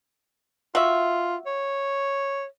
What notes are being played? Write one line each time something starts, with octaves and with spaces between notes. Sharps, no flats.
F4 F#4 E5
C#5